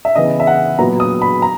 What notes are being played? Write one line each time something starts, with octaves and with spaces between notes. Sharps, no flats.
E5
C#3 E3 B3 D#5
E5
F#5
A#2 F#3 B3 A#5
D#6
B5
A#5